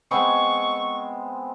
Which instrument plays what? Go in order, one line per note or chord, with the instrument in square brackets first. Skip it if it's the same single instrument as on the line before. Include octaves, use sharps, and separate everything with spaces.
[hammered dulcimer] G#3 B3 C4 [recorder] C#6